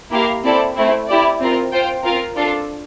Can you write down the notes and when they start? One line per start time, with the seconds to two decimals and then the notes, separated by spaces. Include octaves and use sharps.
0.12 A#3 E4 G4 A#4 F5
0.44 C4 E4 A4 D5
0.76 A3 C4 E4
1.07 E4 G4 D5
1.40 C4 F4 A#4
1.72 F4 C5 G5
2.04 C4 F4 A#4 F5
2.37 D4 F4 A4